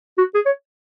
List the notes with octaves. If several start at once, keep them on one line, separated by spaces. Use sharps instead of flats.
F#4
G#4
C#5